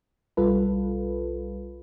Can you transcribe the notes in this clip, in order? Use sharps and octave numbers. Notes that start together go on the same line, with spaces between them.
B1 G3 F4 A4 B4